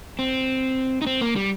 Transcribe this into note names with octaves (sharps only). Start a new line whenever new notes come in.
C4
D#4
C4
A#3
G3